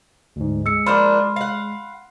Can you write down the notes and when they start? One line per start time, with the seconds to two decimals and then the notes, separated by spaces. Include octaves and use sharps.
0.36 D2 G#2
0.66 G#3 E6 C#7
0.86 F3 A#3 D4 B5 C6 F6
1.36 F5 F#5